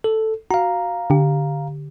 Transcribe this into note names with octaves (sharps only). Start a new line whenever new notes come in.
A4
F#4 F5 A#5
D3 G4